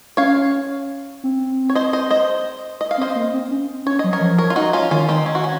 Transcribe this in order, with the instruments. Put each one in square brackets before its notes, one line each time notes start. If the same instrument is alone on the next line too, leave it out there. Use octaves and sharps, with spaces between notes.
[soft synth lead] C#4 [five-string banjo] C#5 F5
[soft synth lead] C4
[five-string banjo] C#5
C5 D#5
C5 D#5
C5 D#5
D#5
F5
[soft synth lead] C4
[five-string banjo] C5 D#5
[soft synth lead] A#3
C4
C#4
[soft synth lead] C#4 [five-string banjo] C#5
[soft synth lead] F#3 [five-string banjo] D#5
[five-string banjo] A#4 C#5
[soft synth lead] F3
[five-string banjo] A#4 C#5
F4
D#4 F#4
C#4 F4
[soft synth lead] D#3 [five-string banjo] C#4 F4
[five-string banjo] C4 D#4
C#4
F#4
C#4